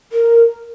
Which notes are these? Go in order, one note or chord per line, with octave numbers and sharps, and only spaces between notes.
A#4